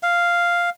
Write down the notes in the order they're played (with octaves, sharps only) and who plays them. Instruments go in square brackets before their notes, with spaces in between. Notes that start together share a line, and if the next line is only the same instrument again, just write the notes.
[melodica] F5